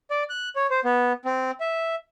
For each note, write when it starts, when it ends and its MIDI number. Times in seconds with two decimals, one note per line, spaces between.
0.11 0.23 74
0.30 0.49 90
0.56 0.67 73
0.70 0.80 72
0.85 1.13 59
1.25 1.51 60
1.60 1.95 76